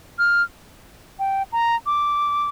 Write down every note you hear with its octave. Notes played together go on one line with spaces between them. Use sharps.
F6
G5
A#5
D6